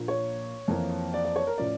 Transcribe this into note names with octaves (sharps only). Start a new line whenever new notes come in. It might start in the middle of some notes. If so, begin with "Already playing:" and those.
Already playing: A#2 F3 A#3 D4
C#5
F2 E3 A#3
D5
D5
C#5
A#4
A2 F3 C#4 D5